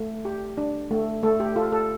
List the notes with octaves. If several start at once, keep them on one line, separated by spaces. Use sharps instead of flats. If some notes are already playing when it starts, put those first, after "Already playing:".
Already playing: A3
G4
D4
A3
A3 A4
G4
F4 A4
A4